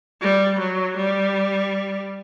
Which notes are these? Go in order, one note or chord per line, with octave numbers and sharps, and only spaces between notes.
G3
F#3
G3